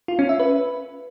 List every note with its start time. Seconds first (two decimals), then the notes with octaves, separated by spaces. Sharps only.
0.08 F4
0.19 C#4
0.29 E5
0.39 B4